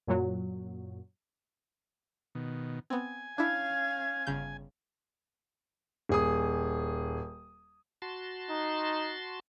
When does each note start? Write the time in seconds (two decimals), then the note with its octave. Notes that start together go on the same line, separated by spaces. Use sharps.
0.07 F#2 A#2 F#3
2.35 B2 D#3
2.90 B3 C4 G#5
3.38 C#4 D4 E4 F5 G#6
4.27 G1 C#3 G6
6.09 D#1 G#4 D#6
8.02 F#4 A5 C6
8.50 D#4